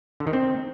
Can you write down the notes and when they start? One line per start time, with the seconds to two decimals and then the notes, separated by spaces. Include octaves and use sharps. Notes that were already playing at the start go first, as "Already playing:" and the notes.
0.20 D3
0.27 D#3
0.33 C4